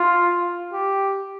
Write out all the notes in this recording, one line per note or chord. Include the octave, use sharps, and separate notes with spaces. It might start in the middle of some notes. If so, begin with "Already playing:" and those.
Already playing: F4
G4